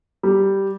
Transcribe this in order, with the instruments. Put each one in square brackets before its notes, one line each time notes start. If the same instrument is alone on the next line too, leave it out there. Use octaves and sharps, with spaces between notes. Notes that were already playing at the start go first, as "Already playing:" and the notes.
[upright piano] G3